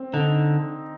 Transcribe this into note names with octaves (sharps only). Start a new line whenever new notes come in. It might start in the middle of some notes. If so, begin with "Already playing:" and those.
Already playing: C4
D3 D#4